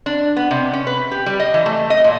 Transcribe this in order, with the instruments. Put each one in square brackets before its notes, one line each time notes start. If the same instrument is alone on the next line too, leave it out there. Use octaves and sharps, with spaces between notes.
[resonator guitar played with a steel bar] D4
B3
C3
C#4
B4
G4
G3
D#5
E3
A3
D#5
A#2